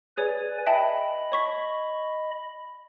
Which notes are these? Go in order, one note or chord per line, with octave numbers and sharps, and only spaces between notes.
G#4 B4 C#5 D5 G#5
D#5 E5 G5 A5 B5
C#5 C#6 B6